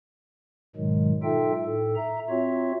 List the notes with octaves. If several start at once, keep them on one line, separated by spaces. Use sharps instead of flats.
G#2 B2 D#3 F#3 G#3
D#4 F4 A4 E5 G5
A2 A4
E5 A#5
C4 F4 F#4 C#5 E5